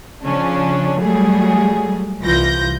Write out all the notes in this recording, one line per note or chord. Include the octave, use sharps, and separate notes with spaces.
C#3 F3 C#4 D4
F#3 G3 A3 G#4
C2 E3 F4 G6 A#6